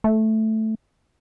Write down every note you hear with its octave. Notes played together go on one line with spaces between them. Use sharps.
A3